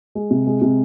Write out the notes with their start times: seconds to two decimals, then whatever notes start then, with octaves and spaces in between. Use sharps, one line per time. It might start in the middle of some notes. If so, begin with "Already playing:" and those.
0.15 G#3
0.31 C3
0.47 G#3
0.62 C3